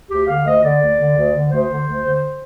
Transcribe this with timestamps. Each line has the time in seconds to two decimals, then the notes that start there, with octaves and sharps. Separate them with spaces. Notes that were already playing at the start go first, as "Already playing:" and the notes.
0.09 D2 G4
0.26 D3 F5
0.45 D2 D#5
0.62 D3 D5
0.81 D2
0.98 D3
1.15 D2
1.33 D3
1.50 D2 C5
1.69 D3
1.87 D2
2.04 D3